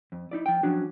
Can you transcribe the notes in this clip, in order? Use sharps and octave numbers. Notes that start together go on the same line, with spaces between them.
F2
D#4 E4 D5
F3 G5
F3 F#3 C#4 D4 F#4